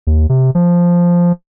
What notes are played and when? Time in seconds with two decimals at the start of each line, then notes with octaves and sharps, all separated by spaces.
0.07 D#2
0.29 C3
0.55 F3